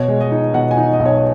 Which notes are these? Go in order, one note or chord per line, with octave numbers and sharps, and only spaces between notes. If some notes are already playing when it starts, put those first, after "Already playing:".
Already playing: B2 C#5
G#3
D#5
D#4
B2 F#5
G#5
D#4
D#5
B1
C#5